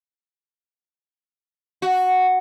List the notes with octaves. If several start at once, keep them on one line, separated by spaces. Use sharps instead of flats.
F#4